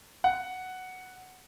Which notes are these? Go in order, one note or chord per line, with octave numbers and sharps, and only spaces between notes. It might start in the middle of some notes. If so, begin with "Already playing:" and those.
F#5